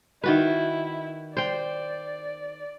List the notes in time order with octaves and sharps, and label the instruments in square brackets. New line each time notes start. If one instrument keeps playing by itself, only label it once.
[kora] D#3 F#4 B4 [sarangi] E4
[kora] C5 G5 [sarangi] D5